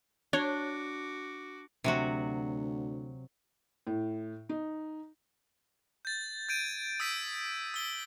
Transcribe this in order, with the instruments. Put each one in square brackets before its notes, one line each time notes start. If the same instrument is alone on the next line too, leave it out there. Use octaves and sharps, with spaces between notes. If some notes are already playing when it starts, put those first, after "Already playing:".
[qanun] D4 [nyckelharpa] F#4 D6 [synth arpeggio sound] C#5
[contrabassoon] D2 [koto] C3 F#3 F#4
[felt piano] A2
D#4
[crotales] G6 A6
G6 G#6 D7 D#7
D#6 E6 G6 B6 D7 D#7
E6 G7